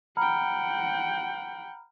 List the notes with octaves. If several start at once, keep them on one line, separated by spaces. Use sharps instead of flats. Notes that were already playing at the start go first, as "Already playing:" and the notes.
F#5 G5 A#5 B5 F6